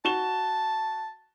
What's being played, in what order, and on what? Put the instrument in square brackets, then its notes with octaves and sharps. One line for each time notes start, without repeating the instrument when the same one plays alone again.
[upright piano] F#4 E7 G7 [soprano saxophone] A5